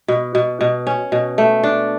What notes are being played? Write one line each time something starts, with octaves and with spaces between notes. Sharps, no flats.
B2
B2
B2
C#4
B2
A3
D4